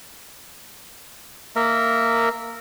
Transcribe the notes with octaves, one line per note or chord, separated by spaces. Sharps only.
A#3 A#4 E5